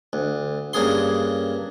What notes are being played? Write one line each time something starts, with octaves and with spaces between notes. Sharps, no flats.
D2
G2 C#3 A#3 G#4 C6